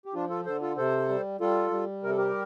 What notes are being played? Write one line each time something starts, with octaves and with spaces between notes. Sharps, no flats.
G4
F3 D4 F4
F4 A4
D3 A4 C5
F4 A4
C3 A4 C5
G3
G3 F4 A4
G3
C3 A#4
A4
G4 A#4